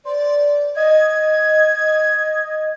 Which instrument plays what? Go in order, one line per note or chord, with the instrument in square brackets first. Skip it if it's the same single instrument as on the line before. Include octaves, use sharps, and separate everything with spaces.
[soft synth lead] C5 [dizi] D5
[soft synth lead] D#5 [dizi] G#6